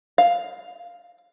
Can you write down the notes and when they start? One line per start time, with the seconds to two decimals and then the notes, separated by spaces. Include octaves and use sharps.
0.18 F5